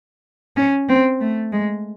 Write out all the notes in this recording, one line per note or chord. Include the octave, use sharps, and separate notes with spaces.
C#4
C4
A3
G#3